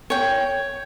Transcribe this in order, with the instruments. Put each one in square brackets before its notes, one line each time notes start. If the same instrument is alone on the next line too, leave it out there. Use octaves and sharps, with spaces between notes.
[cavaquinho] C#5 G5